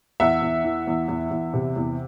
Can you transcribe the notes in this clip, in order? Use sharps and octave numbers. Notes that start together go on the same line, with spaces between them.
E2 E5 F#5
E2
E3
E2
E2
E2
C3
E2